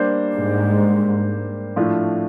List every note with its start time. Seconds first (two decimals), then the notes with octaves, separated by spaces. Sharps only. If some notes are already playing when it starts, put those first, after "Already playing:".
Already playing: G3 A#3 D4 G4 C5
0.36 G#2
1.76 A2 F3 A3 D4 F4